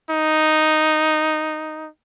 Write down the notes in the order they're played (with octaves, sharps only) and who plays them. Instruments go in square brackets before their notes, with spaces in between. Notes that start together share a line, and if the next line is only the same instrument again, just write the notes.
[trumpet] D#4